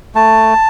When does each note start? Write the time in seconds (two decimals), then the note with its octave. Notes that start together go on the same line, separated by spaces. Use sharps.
0.15 A3 A5